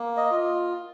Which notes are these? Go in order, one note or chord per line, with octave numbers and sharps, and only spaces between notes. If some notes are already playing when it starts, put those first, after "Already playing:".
Already playing: A#3
D#5
F4